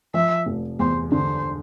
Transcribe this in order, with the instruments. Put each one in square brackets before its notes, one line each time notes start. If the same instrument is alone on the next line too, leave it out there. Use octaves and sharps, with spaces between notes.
[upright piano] F3 [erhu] E5
[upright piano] F1
[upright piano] E2 [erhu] C5
[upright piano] D3 [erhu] C5